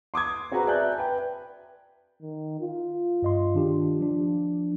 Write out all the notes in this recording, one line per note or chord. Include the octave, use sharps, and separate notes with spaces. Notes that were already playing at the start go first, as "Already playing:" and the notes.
C6 D6 D#6 G#6
C4 F#4 G#4 B4 A#5
D5 E5 G#5 A5 F#6 G6
B4 G5
D#3
F4
G2 D#5 C6
D#3 D4 G4
F3 D4